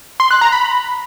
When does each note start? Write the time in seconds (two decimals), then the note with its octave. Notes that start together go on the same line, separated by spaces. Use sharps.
0.20 C6
0.31 F#6
0.41 A#5
0.52 B5